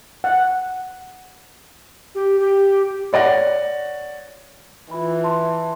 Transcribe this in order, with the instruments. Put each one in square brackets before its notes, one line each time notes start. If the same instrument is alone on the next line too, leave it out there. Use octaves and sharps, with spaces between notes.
[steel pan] F#5
[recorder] G4
G4
[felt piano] C#5 D5 F#5 A#6
[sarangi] E3 [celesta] F4 B5
[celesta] A5 C6